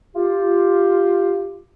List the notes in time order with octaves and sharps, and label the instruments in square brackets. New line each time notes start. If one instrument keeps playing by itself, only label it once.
[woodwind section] F4 G4